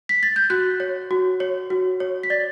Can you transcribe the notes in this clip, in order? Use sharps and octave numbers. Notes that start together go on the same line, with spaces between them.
B6
A6
G6
F#4 F#6
C#5
F#4
C#5
F#4
C#5
B6
D5 A6